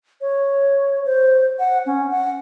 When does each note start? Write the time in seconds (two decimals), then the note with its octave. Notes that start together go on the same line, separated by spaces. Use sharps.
0.21 C#5
1.06 C5
1.59 F#5
1.86 C#4
2.11 F#5